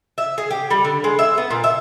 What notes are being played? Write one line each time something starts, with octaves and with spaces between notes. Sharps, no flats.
E5
G#4
G4
G3
D3
G#3
E5
B3
A#2
E5